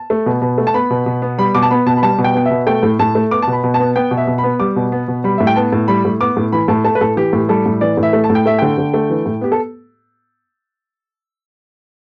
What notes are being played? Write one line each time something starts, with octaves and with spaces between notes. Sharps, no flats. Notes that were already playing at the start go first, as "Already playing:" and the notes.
Already playing: A5
A3
B2
B2
A3
A5
B3 B5
B2
B2
B3
G3 B5
B2 D6
A5
B3 B5
B2 A5
B5
G3 A5
B2
G5
B3 G5
E5
B2
A3 G5
A2
A2 A5
A3
B3 D6
B2 A5
B5
B2
A5
B3
B3 G5
B2
E5
B2
B5
B3
G3 D6
B2
B3
B2
G3 B5
A2 E5
G5
B3 A5
A2
G3 B5
A2
B3 D6
A2
E3 B5
A2 A5
A3 A5
B4
A2 A4
E3 G4
A2
G3 A4
A2
E3 D5
A2
E5
A3
A5
A2
G5
A3 E5
D3 G5
D3
A3
E3
A2
B3 G4
A4